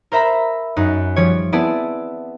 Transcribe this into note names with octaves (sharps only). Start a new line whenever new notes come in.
A#4 C5 E5 A#5 B5
F#2 D#4 F#6
F3 G3 C#5
B3 C4 E4 G#4 D5 A5